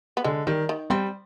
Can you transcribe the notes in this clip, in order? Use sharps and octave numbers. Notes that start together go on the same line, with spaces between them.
B3
D3 G#3
D#3 G3
D#3
G3 C4